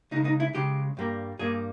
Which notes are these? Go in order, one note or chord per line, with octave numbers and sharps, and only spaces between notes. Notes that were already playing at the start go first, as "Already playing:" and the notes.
C#2 C#3 G#3 D#4
D#4
E4
C#2 C#3 G#3 G4
G2 G3 A#3
G2 G3 A#3 G#4